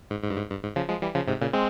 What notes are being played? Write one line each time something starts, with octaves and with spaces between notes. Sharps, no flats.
G#2
G#2
G2
G#2
G2
G#2
C#3 F3
F3 G#3
E3 G3
C#3 F3
G#2 C3
A#2 C#3
G#3 C4